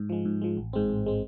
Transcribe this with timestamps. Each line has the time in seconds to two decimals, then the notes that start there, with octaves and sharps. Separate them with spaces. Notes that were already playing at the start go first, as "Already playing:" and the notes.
Already playing: G#2
0.09 F3 G#3
0.25 G#2
0.41 F3 G#3
0.57 A1
0.73 G#2 G#3 C4
0.90 A1
1.06 G#3 C4